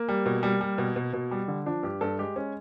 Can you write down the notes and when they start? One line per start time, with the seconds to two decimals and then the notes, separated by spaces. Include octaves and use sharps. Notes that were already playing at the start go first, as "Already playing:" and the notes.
Already playing: A#3
0.08 G3
0.26 B2
0.43 G3
0.61 G3
0.78 B2
0.96 B2
1.13 B2
1.31 G3
1.48 D3
1.66 F3 D4
1.83 G2 G4
2.01 G2 A4
2.19 G#3 G4
2.36 G#3 C#4